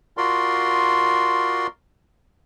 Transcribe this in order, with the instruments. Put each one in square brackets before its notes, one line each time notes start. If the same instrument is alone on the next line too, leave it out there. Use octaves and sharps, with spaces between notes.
[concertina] F4 F#4 A#4 D5 C6